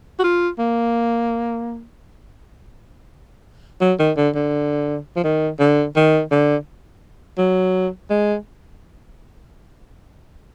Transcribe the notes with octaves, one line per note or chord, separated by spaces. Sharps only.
F#4
F4
A#3
F#3
D#3
D3
D3
F3
D#3
D3
D#3
D3
F#3
G#3